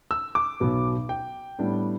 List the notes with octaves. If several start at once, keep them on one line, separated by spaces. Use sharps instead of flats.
E6
D6
B1 B2 B3
G5
A2 G3 B3 D4